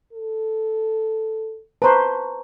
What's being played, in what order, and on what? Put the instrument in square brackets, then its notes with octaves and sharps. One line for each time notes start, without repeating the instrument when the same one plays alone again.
[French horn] A4
[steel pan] B4 C5 [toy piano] A5 A#5 C#6